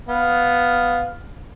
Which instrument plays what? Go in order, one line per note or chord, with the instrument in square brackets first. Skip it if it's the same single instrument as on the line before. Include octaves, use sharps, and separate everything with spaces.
[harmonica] B3 F5